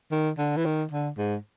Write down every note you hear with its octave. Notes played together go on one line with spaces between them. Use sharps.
D#3
D3
E3
D#3
D3
G#2